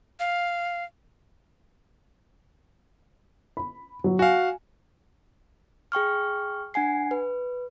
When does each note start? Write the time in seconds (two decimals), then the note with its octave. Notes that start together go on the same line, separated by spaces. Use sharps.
0.20 F5
3.57 B5
4.04 F#3
4.19 F#4 F5 G#5
5.92 G#4 G5 C#6 F6
6.74 D4 F#5 G#5 C7
7.11 B4